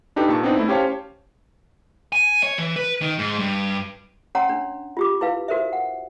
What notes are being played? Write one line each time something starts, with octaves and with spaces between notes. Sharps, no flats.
D4 D#4 G4 A4 B4
A#2 A5 C#6
B3 C4 D4 D#4
A3 E4
C#4 G4 C5 C#5 F5 A5
G#5
C#5
E3
B4
D#3
G#2
G2
C#4 C#5 F#5 A#5 C6
D4
F4 G4 D6
E4 B4 F5
F#4 A#4 C5 E5
F#5